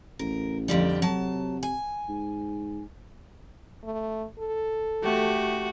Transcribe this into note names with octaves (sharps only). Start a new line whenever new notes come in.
A1 A#4
F2 D3 G3
C3 F#3 A5
G#5
G#2
A3
A4
A3 F#4 G4